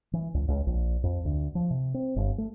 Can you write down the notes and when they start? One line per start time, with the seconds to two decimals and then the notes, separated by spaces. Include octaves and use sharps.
0.13 E3
0.34 C#2
0.48 C#2
0.67 A#1
1.04 F2
1.25 D2
1.55 F3
1.70 C3
1.94 C4
2.16 G1
2.38 A3